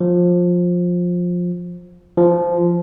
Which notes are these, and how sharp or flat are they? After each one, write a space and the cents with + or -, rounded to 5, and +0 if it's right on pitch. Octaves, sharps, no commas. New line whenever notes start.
F3 +20
F3 -10